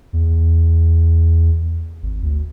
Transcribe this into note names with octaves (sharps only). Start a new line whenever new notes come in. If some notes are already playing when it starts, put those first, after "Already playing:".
E2
G#1
D2